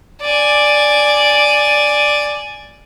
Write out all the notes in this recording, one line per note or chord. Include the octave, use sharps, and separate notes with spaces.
D5 G#5